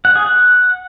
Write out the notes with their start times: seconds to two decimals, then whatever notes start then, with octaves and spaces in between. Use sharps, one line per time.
0.05 F#5
0.16 G#4
0.26 F#5